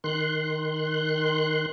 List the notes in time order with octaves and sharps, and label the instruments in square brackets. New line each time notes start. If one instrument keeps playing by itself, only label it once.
[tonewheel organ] D#3 C6 F#6